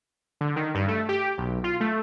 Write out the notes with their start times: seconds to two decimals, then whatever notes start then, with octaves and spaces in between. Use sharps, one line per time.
0.41 D3
0.56 D#3
0.75 G2
0.88 A3
1.09 G4
1.38 B1
1.64 F4
1.80 A3